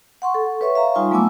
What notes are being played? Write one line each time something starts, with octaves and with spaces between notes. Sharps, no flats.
F#5 C6 C#6
A4
B4 C#5 E5 C#6
E5 F5 A#5
G3 D#4 F4 G#5 C6 C#6
F#3 A3 B3 G#5 D6 E6